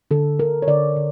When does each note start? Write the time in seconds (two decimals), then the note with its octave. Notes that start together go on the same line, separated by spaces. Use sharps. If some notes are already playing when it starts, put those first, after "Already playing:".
0.11 D3 A4
0.39 D3 A#4
0.62 C#5
0.67 D3 D5
0.96 D3